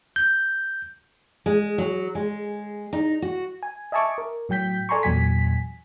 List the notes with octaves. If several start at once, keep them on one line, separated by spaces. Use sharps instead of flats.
G6
G#3
F#3
G#3
D#4
F#4
G#5
D#5 E5 G#5 A5 C#6 D6
A#4
A2 F#3 G5 G6 B6
A4 D5 G#5 A#5 C6 C#6
E2 A#2 F#3 G#5 B6